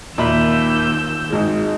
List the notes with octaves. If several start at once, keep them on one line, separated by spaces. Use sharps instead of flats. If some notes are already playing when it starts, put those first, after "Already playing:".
D#2 A#2 E5 B5 E6 G6
G#1 G#3